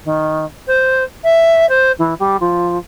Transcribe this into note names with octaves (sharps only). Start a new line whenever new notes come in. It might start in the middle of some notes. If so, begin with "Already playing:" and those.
D#3
C5
E5
C5
E3
G3
F3